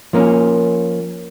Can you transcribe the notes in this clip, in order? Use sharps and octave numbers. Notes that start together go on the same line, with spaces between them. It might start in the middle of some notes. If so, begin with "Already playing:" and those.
F3 A#3 C#4